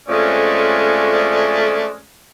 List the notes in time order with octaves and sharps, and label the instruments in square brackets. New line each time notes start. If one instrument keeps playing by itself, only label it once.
[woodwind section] F2 G#3 C#4 [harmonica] A3 D5